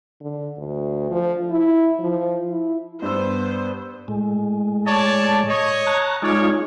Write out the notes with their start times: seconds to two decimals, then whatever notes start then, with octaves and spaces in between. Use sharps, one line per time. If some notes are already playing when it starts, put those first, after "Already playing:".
0.21 D3
0.58 D2
1.11 F3
1.51 E4
2.00 F3
2.49 E4
3.02 G2 B3 C5 E6
4.08 A2 G#3
4.86 C#5 D5 A5
5.47 C#5 D#5
5.87 A5 A#5 F#6
6.22 G#3 D#4 F4 C#5 D5